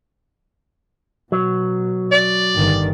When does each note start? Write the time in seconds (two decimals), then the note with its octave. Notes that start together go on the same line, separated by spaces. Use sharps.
1.32 B2 F#3
2.12 D5
2.55 G1 D#3